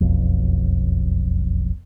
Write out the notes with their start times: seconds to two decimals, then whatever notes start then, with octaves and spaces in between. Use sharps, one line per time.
0.01 E1 B1 F2